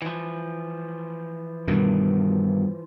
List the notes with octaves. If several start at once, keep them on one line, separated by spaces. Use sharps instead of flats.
E3 F3
G2 B2 D#3